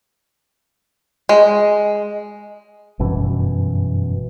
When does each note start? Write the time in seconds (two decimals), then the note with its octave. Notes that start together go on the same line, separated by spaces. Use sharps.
1.29 G#3
2.99 G1 F#2 B2 E3